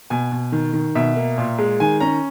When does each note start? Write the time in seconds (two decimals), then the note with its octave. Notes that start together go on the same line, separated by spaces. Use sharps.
0.10 B2 G#5
0.32 B2
0.52 D#3
0.73 D#3
0.95 B2 E5
1.16 A#3
1.38 A#2
1.59 G#3
1.80 D#3 G#5
2.00 C#4 A#5